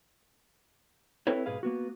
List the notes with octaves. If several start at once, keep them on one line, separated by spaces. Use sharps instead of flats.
C4 E4 A4 B4 C#5
B1 G#2 G#4 B4 F5
A#3 B3 F#4